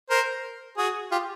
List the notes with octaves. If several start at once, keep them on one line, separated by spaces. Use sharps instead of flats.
A#4 C5
F#4 G#4
F4 G4